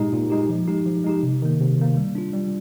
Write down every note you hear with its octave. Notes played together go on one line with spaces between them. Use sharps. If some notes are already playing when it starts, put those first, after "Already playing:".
Already playing: A#2 G#3 D#4 G4
A#2
G#3 D#4 G4
F3
G#3 D#4 G4
F3
G#3 D#4 G4
C3
D#3 A#3
C3
D#3 A#3
G3
D4 F4
G3